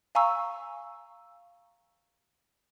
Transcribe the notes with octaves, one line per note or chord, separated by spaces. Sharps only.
F5 G#5 A#5 C#6 E6